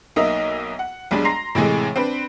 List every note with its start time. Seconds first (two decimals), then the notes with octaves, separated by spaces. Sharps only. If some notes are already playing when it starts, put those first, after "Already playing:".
0.16 B1 A#3 D#4 D#5 E5
0.79 F#5
1.11 B1 G3 G#3 D4
1.25 A#5 C6 A#6 C7
1.55 A2 C3 E3 G#3
1.96 C4 D4 B4